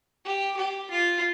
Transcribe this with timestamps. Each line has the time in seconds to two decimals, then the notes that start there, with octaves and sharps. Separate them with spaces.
0.25 G4
0.57 G4
0.91 F4